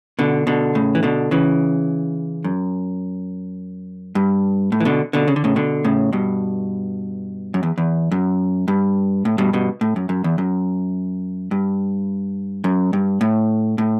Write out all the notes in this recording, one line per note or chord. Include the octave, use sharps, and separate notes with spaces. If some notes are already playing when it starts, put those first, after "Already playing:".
B2 D3
B2 D3
A2 C#3
E3
B2 D3
C#3 E3
F#2
G2
A2
E3
B2 D3
B2 D3
C#3
D3
A2 C#3
B2 D3
A2 C#3
G2 B2
F#2
E2
E2
F#2
G2
A2
G2 B2
G2 B2
A2
F#2
F#2
E2
F#2
G2
F#2
G2
A2
A2